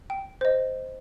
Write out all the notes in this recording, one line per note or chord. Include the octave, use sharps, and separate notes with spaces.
G5
C5 D#5